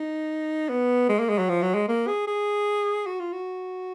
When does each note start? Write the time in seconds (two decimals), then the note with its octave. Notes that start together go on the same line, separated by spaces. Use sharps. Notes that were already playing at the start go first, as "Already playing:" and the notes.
Already playing: D#4
0.69 B3
1.09 G#3
1.19 A#3
1.29 G#3
1.39 F#3
1.49 F3
1.62 F#3
1.74 G#3
1.89 A#3
2.08 G#4
2.28 G#4
3.07 F#4
3.20 F4
3.33 F#4